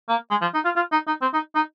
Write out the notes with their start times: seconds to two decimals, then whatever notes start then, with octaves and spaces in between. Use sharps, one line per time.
0.09 A#3
0.30 G#3
0.42 F3
0.54 D#4
0.64 F4
0.76 F4
0.92 D#4
1.07 D#4
1.22 C4
1.34 D#4
1.55 D#4